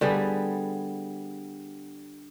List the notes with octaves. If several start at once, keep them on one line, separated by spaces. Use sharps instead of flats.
D3 G3 B3 G#4